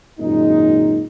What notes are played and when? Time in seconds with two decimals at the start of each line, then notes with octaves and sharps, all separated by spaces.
0.19 G#1 F#2 A#2 G#3 D#4